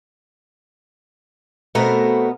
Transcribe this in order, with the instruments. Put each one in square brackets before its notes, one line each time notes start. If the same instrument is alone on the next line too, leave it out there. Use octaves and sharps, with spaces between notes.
[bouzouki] B2 B3 A#4 [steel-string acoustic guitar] A3 C4